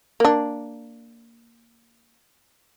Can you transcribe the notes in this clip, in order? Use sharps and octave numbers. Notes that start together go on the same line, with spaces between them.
A#3 D4